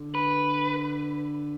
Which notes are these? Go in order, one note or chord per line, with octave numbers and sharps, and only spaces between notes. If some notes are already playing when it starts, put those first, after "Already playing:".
Already playing: D3
B4